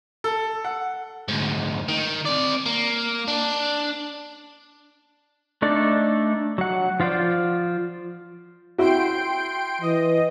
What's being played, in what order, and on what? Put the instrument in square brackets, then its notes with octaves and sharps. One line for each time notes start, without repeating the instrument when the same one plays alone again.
[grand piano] A4
F#5
[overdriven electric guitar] D2 G#2
D#3
C4 D5
A#3
D4
[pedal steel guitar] A3 D4 D#4 A4 D5
F#3 F#5
F3 F4 C5 D5
[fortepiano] E4 F#4 [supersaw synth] G5 C6 D7
[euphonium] E3 [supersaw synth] D#5